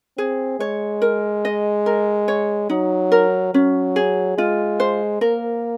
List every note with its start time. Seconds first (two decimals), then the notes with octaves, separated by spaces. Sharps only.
0.18 C4 G#4
0.60 G#3 C#5
1.02 A#4
1.45 D#5
1.86 A#4
2.28 C#5
2.70 F#3 D#4
3.12 A#4
3.54 F#3 C#4
3.96 G#4
4.38 G#3 F4
4.80 C5
5.21 A#3 A#4